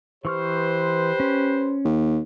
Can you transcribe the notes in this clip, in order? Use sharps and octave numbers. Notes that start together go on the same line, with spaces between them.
E3 G4 B4 C5 C#6 F6
C#4
D#2